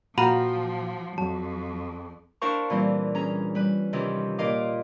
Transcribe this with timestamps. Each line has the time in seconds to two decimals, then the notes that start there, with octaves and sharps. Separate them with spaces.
0.18 A#2 F3 F#4 F5 G5 A#5 B5 D#7
1.18 F2 F#3 A5
2.42 D4 E4 A#4 C5 F5 C#6
2.70 A#2 E3 G3 C4
3.15 C#4 G#4 A#5
3.55 G3 B4
3.93 C3 D#3 E3 C#4 F4 G4
4.38 A#2 F4 A#4 D#5 F5 D6